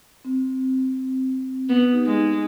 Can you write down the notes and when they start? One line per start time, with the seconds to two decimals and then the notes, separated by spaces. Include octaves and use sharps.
0.25 C4
1.69 B3
1.93 D#4 G4
2.05 G#3
2.17 D#4